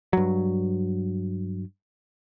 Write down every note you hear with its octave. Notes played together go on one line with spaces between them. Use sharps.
G2 F#3